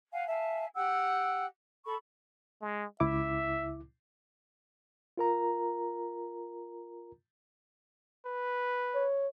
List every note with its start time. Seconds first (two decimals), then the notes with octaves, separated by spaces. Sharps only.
0.12 F5 F#5 G#5
0.27 E5 F5 G#5 A5
0.75 G4 F#5 G5 E6
1.85 A4 B5 C#6
2.62 G#3
3.00 C#2 E4 E5 D6
5.17 F4 A#4 A#5
8.26 B4
8.95 C#5